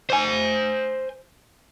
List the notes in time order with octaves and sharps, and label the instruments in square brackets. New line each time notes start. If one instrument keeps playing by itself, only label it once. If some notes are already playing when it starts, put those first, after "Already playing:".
[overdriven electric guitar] C5 G#5